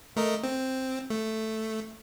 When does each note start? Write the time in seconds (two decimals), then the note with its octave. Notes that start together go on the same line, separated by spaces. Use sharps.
0.16 A3 A#4 D#5
0.44 C4
1.10 A3